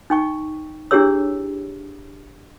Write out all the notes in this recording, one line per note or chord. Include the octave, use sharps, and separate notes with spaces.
D#4 G5 C#6
D4 E4 G4 G#4 C#5 E6